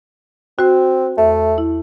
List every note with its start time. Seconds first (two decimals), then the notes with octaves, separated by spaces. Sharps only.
0.59 C4 F#4 C5
1.18 E2 A3 E5
1.58 E4